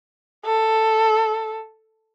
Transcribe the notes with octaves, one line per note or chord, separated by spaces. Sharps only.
A4